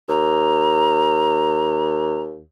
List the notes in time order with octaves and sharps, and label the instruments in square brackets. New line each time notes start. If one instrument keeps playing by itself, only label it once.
[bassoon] D#2 [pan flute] A#5